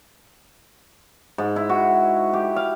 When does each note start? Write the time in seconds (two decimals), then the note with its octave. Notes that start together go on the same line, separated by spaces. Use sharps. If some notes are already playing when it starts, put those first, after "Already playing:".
1.38 G#2
1.56 E4
1.69 F#4
2.34 G4
2.56 F5